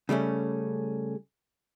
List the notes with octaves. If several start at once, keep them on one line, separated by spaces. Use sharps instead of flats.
C#3 G3 A3 C#4